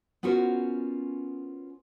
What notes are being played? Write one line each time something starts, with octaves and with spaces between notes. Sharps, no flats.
B3 C#4 F4 F#4 A#4 C5